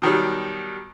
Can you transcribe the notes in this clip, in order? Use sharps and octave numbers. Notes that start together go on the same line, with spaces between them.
B2 D#3 F#3 G3